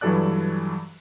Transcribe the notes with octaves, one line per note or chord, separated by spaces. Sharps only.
G2 E3 F#3 A4 D5 F#6